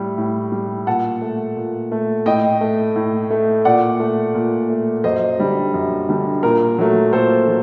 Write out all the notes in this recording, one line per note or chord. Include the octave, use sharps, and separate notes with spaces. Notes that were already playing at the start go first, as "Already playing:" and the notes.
Already playing: A2 G3
A2
G3
A#2 F#5 A5
A3
A#2
A3
A2 D#5 G5
A3
A2
A3
A#2 D5 F#5
A3
A#2
A3
F#2 C5 D#5
D3 G3
F#2
D3 G3
A#2 A#4
F#3 A3
A#2 A4 C5
F#3